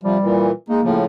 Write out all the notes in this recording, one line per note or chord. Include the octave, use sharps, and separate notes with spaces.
C3 F3 G3
A#2 E3
G#3 A#3 D#4
A2 C#3 F3